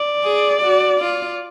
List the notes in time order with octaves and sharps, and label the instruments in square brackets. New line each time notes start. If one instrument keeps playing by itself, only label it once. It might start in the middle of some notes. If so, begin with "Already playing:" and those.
Already playing: [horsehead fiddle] D5
[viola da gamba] G#4
F#4
F4